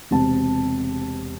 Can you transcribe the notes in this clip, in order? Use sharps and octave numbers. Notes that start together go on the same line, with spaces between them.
E1 C3 C4 A5